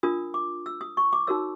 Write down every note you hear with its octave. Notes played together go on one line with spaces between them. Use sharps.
D4 F4 A#4 D#6
D6
E6
D#6
C#6
D6
D#4 F#4 A#4 C#5 E6